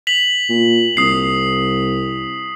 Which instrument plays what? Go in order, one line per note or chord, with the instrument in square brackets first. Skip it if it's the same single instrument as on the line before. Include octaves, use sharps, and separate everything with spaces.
[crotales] B6 F7 F#7
[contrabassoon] A#2
[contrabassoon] C2 [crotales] D#6 C7